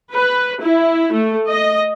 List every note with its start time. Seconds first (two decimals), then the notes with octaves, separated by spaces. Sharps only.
0.13 B4
0.62 E4
1.11 A3
1.49 D#5